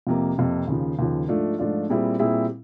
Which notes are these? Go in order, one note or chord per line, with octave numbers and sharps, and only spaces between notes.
F2 C3 F3 A#3
F2 C3 F3 A#3
D#2 C#3 F3
D#2 C#3 F3
G#2 F3 A3 D4 F4
G#2 F3 A3 D4 F4
A#2 G3 C4 E4 G#4
A#2 G3 C4 E4 G#4